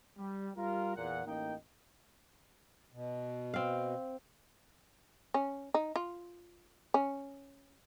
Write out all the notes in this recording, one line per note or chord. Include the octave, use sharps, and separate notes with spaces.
G3
G3 F4 A#4
E2 A#2 F#5
A1 A#3 D#4 D#5 G5
B2
C4 F5
C#4
D#4
F4
C#4